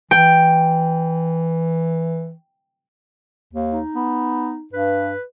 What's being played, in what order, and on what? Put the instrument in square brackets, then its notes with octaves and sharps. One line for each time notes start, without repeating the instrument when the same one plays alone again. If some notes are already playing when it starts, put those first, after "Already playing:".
[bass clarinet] E3 [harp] G5
[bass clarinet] D#2
[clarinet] D#4
[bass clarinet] B3
[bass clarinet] G2 [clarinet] B4